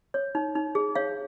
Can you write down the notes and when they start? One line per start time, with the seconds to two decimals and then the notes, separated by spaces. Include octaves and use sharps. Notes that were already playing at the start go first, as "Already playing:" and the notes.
0.14 C#5
0.35 D#4
0.55 D#4
0.75 G#4
0.95 C#5 F5